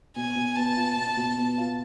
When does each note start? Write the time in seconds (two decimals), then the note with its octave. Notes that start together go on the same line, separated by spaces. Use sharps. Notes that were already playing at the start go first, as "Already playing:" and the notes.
0.16 B2 G#5
0.36 B2
0.56 B3 A5
0.77 F4
0.97 B2
1.17 B2
1.38 B3
1.58 F4